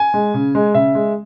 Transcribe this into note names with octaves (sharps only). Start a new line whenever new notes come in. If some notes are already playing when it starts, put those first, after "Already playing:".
Already playing: G#5
G#3
C#3
G#3
C#3 E5
G#3